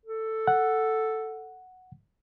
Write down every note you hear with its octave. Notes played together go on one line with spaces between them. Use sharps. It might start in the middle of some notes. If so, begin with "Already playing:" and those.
A4
F#5